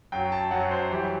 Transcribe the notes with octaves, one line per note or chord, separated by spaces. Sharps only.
F#2 F#3 G5
A5
F#2 F#3 F#5
C5
F#2 E3 G3 G4